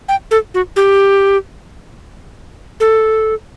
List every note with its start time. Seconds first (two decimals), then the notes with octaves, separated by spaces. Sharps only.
0.08 G5
0.31 A4
0.54 F#4
0.76 G4
2.80 A4